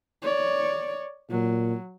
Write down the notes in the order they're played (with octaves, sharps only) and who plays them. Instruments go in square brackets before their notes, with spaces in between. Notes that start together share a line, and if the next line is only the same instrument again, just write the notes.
[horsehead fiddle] C#5 D5
[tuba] A#2 [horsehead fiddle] F#3